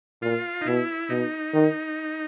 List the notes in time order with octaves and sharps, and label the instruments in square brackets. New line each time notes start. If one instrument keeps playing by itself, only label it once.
[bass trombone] A#2 [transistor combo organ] F4
[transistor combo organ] D#4
[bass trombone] B2 [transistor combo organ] E4
[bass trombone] B2 [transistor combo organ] D#4
[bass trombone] D#3